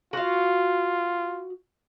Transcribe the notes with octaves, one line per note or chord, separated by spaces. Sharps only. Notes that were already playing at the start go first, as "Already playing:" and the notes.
F4 F#4 F5